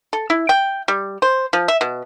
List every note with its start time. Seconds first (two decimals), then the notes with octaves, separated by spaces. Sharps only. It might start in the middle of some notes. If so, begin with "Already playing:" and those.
0.13 A4
0.30 E4
0.49 G5
0.88 G3
1.22 C5
1.53 F3
1.68 E5
1.81 B2